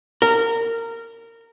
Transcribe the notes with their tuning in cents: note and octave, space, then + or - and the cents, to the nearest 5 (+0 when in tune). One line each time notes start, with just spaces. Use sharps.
A#4 -20